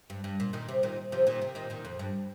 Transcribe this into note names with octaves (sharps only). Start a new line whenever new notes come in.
G2
G2
A#2
A#2 D#3
C3
A#2 D#3
C3 F3
A#2 D#3
C3
A#2 D#3
A#2 D#3
F2
G2